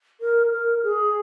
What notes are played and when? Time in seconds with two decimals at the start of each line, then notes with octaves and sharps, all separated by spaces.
0.20 A#4
0.52 A#4
0.83 G#4